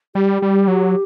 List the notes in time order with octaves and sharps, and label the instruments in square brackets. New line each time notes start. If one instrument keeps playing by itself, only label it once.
[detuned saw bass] G3 [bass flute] G4
[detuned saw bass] G3
F#3